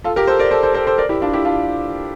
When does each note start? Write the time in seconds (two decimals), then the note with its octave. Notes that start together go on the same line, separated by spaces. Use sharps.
0.04 F4 A4
0.16 G4 A#4
0.27 A4 C5
0.39 A#4 D5
0.51 A4 C5
0.63 A4 C5
0.74 A4 C5
0.87 A4 C5
0.98 A#4 D5
1.09 E4 G4
1.22 D4 F4
1.33 E4 G4
1.45 D4 F4